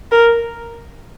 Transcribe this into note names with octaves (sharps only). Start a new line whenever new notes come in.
A#4